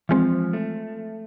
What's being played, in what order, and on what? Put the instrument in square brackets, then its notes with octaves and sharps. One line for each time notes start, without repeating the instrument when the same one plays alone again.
[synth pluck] E3 G#3 C4 [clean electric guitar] F3
[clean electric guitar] A3